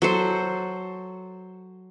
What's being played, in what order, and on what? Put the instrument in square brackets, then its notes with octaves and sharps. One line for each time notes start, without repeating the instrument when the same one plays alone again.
[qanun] F#3 A4 C5